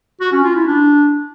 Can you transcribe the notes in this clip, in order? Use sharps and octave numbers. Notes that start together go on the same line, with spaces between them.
F#4
C#4
F4
E4
D4